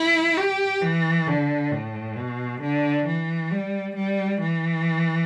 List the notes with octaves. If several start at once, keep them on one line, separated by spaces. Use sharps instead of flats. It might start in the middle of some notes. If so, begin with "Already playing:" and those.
Already playing: E4
G4
E3
D3
A2
B2
D3
E3
G3
G3
E3